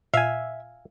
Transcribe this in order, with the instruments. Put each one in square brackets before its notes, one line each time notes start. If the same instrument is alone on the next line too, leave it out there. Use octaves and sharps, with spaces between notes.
[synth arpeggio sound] A#2 [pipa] E5 [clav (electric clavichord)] F5 G#5